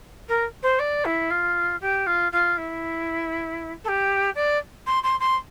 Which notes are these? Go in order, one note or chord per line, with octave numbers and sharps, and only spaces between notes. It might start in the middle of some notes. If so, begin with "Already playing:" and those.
A#4
C5
D5
E4
F4
G4
F4
F4
E4
A4
G4
D5
C6
C6
C6